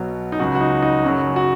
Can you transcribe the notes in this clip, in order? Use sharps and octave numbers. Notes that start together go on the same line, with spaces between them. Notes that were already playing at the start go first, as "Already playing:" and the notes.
Already playing: B1 B2 F#3
D#4
C#2 C#3 F#3 F#4
F#4
D#4
D#4
F#1 F#2 C#3 F#3 F#4
F#4